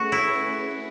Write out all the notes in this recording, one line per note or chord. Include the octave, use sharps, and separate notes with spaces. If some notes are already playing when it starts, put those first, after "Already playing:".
Already playing: A3 C#4 F#4 G#4 B4
E4